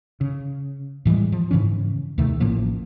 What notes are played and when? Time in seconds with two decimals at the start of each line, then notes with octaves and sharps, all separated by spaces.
0.21 C#3
1.05 A2 E3 G3 G#3
1.32 F3
1.51 G#2 C#3 E3 C#4
2.18 D#2 C3 D#3 A3
2.40 A1 A2 F3 A#3